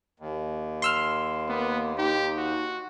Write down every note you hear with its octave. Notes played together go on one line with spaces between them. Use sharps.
D#2
C6 E6 F6
A#3 B3
D#4 G4
F#4